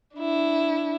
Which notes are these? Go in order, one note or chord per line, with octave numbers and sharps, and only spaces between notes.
D4 E4